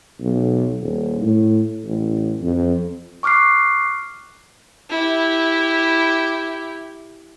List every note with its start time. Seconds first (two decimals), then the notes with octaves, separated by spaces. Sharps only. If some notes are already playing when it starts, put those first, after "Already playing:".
0.20 B1
0.81 D#1
1.21 A2
1.84 A1
2.41 F2
3.23 C#6 D6 F6 F#6 C7
4.90 E4 G4